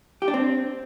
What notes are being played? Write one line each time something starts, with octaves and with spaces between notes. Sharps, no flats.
G4
D4
C4